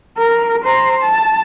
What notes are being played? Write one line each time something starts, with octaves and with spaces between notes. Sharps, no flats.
A#4
C5 A#5
A5